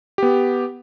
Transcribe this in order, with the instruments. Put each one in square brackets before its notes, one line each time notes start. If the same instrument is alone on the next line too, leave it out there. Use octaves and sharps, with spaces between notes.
[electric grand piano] B3 G4